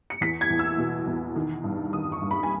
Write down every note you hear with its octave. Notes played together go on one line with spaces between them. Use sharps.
C#7
E2 B6
G#6
E2
E6
B2
E2
D#3
G2
D#3 D#6
C#6
G2
B5
G#5